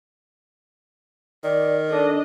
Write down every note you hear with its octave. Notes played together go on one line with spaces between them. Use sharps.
D#3 D5
D4 A4 D#5